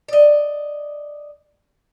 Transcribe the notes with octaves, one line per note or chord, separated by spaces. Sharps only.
D5 D#5